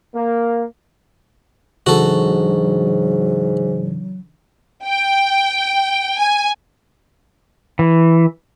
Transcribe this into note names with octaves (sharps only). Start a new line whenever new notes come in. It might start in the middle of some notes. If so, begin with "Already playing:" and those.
A#3
G#2 C#3 E3 F#3 D4 F#4 A4
G5
G#5
E3